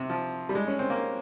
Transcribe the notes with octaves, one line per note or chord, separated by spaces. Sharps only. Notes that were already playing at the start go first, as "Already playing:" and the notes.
Already playing: C3
F3
G3
G#3
C#4
C4
A#3